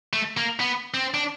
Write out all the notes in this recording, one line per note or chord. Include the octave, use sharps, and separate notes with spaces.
A3
A#3
B3
C4
D4